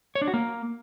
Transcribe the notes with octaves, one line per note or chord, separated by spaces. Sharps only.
C#5
D4
F#4
A#3